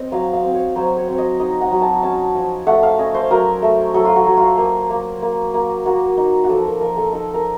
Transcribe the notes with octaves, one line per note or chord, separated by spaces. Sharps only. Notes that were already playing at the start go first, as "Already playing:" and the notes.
Already playing: C4 D#5
F#3 F5
F5
C4
C#5
F#3 C5
C#5
C4
D#5
D#4 D#5
F#5
F#3
A5
C#4 A5
F3
A3 F#5
F5
C#4 D#5
C5
F#3 A#4
A3
F#3 A4
F4
F#4
F#3
F4
A#3
A#3
A#3
A#3
A#3 F#4
D#4
F#4
F3 A4
A#4
F3 A#4
A4
D#4 A4
A#4